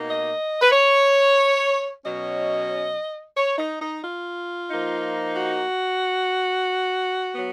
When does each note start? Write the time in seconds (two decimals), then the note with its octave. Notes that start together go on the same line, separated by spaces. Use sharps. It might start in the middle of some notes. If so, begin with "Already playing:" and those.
Already playing: B2 A#3 D#4
0.08 D#5
0.61 B4
0.71 C#5
2.03 B2 F#3 C#4 D#5
3.36 C#5
3.58 D#4
3.80 D#4
4.03 F4
4.69 F3 A#3 D#4
5.36 F#4
7.35 F#3 B3